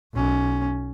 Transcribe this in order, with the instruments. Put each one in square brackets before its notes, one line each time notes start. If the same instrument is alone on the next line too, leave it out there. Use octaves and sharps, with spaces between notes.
[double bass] B1 C#4